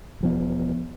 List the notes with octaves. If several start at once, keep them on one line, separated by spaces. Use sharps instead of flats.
E1 F3 B3